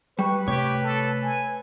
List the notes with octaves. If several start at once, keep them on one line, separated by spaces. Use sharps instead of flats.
G3 B4 C#6
C3 A3 C4 G4 C#5
A4
G#5